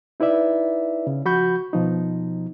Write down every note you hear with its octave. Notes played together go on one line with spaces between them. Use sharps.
D#4 E4 B4 D5 E5
C#3
F3 F#4 B5 C#6 G6
B2 F3 D#4